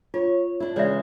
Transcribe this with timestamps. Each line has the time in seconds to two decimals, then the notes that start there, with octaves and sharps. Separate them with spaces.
0.14 F4 C#5
0.60 D4 E4
0.76 C#3 E3 G#3 C#5 D5 E5